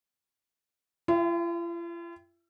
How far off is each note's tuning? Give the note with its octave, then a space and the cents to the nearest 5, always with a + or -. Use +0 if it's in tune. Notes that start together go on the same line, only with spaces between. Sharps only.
F4 -45 E5 +20 G5 +0